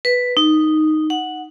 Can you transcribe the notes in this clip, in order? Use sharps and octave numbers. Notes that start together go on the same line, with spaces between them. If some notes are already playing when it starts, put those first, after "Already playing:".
B4
D#4
F#5